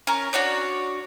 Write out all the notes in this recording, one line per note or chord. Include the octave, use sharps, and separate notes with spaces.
C#4 A#4
D4 F#4 C#5 D5